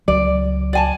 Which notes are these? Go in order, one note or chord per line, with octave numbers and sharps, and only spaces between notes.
C#2 F#3 D5
D5 G#5 A5